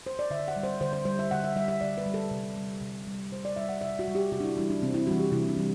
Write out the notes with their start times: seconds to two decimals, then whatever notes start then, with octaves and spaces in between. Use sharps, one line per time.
0.06 C5
0.19 D5
0.30 D3 E5
0.48 F#5
0.56 G3
0.64 C5
0.80 D3 C5
0.93 C5
1.05 G3 C5
1.19 E5
1.31 D3 F#5
1.44 E5
1.56 G3 E5
1.68 E5
1.81 D3 D5
1.98 B4
2.06 G3
2.14 A4
2.31 C3
2.57 G3
2.81 C3
3.07 G3
3.31 C3 C5
3.45 D5
3.56 G3 E5
3.69 F#5
3.81 C3 E5
3.99 F#4
4.08 G3
4.15 G4
4.31 C3 F#4
4.40 D4
4.44 E4
4.57 E3 G3 E4
4.70 D4
4.82 C3 C4
4.94 E4
5.07 E3 G3 F#4
5.20 G4
5.32 C3 E4
5.49 D4
5.57 E3 G3